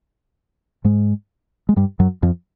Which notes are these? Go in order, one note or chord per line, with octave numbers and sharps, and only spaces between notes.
G#2 G#3
G#3
G2 G3
F#2 F#3
F2 F3